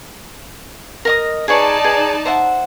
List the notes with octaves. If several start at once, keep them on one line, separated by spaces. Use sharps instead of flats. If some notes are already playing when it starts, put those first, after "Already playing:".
A#4 D#5 D#6
D#4 G#4 B4 C#5 D5 A5
G#4 B4 B5
C5 E5 F#5